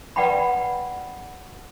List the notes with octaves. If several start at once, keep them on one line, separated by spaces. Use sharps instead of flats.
B4 D5 F#5 G5 A#5 B5